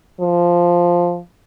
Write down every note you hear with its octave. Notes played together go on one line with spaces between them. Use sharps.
F3